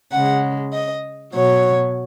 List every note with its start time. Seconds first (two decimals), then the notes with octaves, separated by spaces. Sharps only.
0.11 C#3 G#3 F#5
0.73 D#5
1.33 B2 F#3 C#5